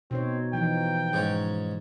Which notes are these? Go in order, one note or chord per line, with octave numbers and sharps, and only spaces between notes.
B2 C4 D#4 C#5
E3 F3 D#4 G5
G#2 C#4